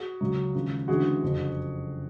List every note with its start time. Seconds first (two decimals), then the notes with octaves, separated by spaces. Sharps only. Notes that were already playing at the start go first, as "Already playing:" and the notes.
Already playing: F#4 G#4
0.21 C#2 C#3 F#3
0.54 D#2 C#3 F3 G#3
0.88 D2 C#3 E3 G#3 F#4 G#4
1.23 F#1 F2 D3